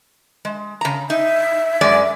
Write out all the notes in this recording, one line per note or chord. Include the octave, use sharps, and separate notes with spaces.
G#3
C#3 A#5
D#4 E5
F#2 G#3 D5